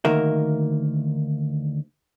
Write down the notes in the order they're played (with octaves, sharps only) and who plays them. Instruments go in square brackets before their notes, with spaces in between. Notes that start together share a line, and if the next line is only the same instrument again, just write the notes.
[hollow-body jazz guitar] D2 D#3 A#3 A#4 E5